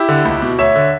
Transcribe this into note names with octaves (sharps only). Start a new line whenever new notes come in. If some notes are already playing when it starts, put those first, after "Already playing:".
Already playing: E4 G4
D3
C#2
B2
D2 C#5 E5
D3